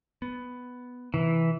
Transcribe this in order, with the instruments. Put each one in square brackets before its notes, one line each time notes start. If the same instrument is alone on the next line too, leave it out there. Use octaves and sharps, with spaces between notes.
[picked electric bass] B3
[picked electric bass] C3 [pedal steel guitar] E3